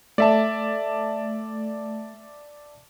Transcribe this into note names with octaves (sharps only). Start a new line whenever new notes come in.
A3 D5 E5 A5